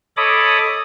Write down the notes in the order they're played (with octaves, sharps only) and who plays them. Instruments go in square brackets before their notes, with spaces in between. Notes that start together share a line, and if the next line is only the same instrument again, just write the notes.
[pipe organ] A4 C#5 D#5 B5 D6 D#6